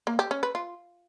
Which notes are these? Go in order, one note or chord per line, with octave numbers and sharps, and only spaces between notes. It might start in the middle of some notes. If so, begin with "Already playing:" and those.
A#3
G4
C#4
B4
F4